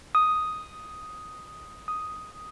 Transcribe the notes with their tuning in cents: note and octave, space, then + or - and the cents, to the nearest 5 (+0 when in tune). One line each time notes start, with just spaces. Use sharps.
D#6 +5
D#6 +5